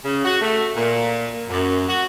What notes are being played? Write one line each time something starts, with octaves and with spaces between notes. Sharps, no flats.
C#3
F#4
A3
A#2
F#2
F#4